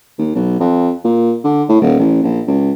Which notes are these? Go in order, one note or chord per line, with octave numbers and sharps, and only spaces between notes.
D#2
B1
F2
A#2
D3
A2
D#1
A1
A#1
C#2